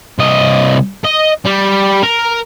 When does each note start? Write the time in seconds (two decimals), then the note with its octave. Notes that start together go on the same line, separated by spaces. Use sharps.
0.19 C2 D#5
1.05 D#5
1.46 G3
2.03 A#4